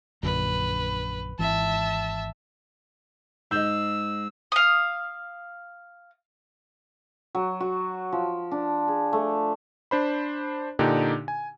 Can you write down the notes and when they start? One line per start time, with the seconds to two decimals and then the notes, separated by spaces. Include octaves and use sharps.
0.23 A#1 F#2 D3 B4
1.39 G#1 E3 E5 A5
3.51 G#2 D#5 E6 G6
4.52 F5 D#6
7.35 F#3
7.60 F#4
8.13 F3
8.51 D4
8.88 G#4
9.13 A3
9.91 D4 C5 B5
10.79 A#2 D3 D4 D#4 G4
11.28 G#5